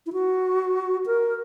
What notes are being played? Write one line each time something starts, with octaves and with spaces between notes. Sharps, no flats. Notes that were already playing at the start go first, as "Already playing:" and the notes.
E4
F#4
A#4